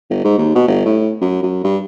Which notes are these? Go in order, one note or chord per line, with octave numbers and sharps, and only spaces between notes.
G1
G#2
D#2
B2
G1
A2
F#2
F#2
G2